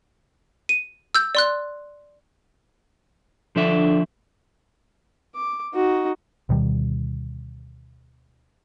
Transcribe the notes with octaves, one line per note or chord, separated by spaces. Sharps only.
D#7
E6 G6
D5 C6 F#6
D3 F3 D4 E5
D6
D#4 F#4
D2 B2 D#3 G3